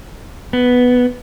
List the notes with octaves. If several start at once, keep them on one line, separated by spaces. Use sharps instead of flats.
B3